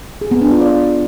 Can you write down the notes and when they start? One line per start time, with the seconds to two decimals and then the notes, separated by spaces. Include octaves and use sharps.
0.21 G#4
0.31 B3
0.41 D4
0.51 F4
0.61 D5